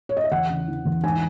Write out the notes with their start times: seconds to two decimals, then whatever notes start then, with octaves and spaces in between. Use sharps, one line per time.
0.09 C#5
0.17 D#5
0.24 E5
0.31 E2 F#5
0.50 C#3
0.68 E3
0.85 E2
1.03 G#2 G#5